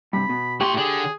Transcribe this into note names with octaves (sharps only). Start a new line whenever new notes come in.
G2 C3 B5
B2
A2 G4 C6 C#6
D3 G#4